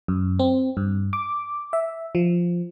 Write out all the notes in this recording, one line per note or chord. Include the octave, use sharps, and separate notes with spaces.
F#2
C4
G2
D6
E5
F3